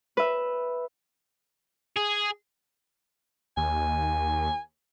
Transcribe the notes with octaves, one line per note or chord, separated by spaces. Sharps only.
B4 E5
G#4
D#2 G#5